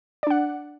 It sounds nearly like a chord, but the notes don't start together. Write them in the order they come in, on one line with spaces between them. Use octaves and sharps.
D5 D4 F#5